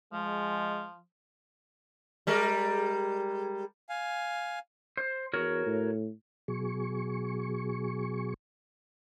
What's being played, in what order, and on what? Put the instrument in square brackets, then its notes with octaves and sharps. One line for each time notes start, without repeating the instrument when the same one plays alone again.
[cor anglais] F3 [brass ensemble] G#3
[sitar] G3 G#3 A#4
[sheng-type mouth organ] F5 G#5
[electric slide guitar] C5
[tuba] E2 [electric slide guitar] F#4 A#4 C#5
[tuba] A2
[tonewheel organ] B2 F#3 G#4 C#6